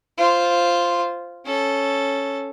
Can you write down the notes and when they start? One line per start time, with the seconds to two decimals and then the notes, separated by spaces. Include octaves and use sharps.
0.18 F4 C5
1.46 C#4 A4